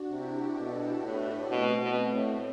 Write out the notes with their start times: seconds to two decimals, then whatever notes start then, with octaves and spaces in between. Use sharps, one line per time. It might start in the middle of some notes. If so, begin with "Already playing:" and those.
Already playing: D4 F#4
0.10 C3 E4 G4
0.57 B2 F#4 A4
1.04 A2 G4 B4
1.50 B2 A3 C4
1.81 B2
2.13 A2